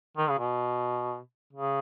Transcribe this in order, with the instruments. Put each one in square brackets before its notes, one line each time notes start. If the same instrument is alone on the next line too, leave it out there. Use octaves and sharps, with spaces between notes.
[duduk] D#3
C#3
B2
C#3